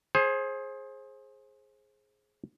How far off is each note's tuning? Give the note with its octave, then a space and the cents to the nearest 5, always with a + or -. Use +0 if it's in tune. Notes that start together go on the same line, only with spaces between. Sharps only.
G#4 +10 C5 +30